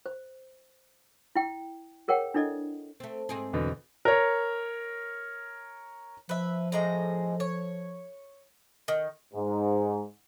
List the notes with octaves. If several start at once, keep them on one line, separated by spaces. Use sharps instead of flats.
C5
E4 G5
G#4 A#4 C#5 F#5 G5
D4 E4 A4 D5 D#5
A3 C4
G#2 C4 G#4
E2 B2 D3
A#4 C#5
F3 B4 E5
A2 G#3 A#5
C#5
D#3
G#2